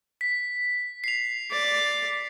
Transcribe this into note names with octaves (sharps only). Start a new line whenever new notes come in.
B6
C7 F7
D5